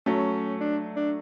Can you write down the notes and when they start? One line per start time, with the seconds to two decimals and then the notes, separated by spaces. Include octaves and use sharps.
0.06 F#3 A3 C#4
0.61 D4
0.96 D4